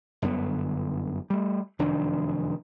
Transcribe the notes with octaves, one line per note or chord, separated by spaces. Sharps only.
G1 F#2 D3 B3
G3 A3
F1 F#2 D#3 D4